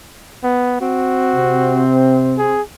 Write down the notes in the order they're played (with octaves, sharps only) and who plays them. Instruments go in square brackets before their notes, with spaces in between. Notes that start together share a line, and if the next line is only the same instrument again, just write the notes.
[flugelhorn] B3
[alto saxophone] C4 [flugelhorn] F#4
[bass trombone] C3
[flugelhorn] G#4